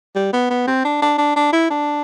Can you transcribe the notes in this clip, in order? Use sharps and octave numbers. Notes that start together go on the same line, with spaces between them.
G3
B3
B3
C4
D4
D4
D4
D4
E4
D4